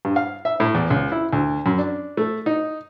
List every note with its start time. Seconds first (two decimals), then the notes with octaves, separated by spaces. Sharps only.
0.05 G2
0.16 F5
0.45 E5
0.60 A2
0.75 E2
0.90 C#2
1.12 E4
1.33 D2
1.66 F#2
1.78 D4
2.17 A3
2.46 D#4